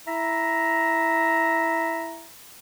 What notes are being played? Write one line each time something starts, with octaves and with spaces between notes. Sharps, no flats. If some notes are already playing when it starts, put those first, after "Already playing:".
E4 E5 A#5